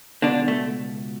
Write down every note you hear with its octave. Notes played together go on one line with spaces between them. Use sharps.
C#2 B2 D3 D4
A3